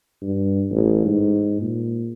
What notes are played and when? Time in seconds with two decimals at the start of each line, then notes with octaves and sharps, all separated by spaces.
0.22 G2
0.70 A1
1.05 G#2
1.61 A#2